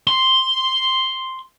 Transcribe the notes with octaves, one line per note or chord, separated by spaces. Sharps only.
C6